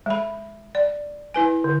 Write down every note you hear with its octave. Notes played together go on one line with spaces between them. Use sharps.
G#3 B5
D5
E4 B4 G#5
D3